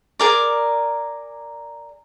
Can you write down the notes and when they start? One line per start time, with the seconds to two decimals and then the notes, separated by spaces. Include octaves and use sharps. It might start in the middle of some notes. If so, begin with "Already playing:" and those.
0.19 G#4 A#4 D5